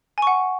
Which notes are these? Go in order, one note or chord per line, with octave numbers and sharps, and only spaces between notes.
F#5 G#5 C#6